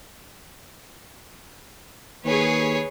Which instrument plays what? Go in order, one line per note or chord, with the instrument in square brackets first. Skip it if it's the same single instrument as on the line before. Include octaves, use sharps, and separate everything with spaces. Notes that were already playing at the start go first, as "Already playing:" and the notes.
[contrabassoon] D#2 [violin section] G#4 B4 C#5